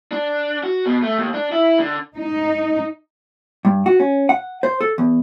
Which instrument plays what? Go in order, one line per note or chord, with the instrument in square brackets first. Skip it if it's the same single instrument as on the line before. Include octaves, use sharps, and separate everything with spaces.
[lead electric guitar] D4
F#4
B2
A3
D#2
D4
E4
D3
[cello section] D#4
[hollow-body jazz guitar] G2
F#4
C#4
F#5
C5
A4
E2